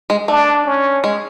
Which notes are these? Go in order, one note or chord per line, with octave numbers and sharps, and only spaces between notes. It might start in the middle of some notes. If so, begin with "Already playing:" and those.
G#3
A3 D4
C#4
G#3